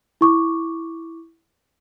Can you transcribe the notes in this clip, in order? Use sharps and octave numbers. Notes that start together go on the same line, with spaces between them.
E4 C#6 D6